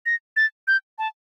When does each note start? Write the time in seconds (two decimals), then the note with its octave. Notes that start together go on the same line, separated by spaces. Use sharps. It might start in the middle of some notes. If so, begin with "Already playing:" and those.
0.06 A#6
0.36 A6
0.68 G6
0.98 A5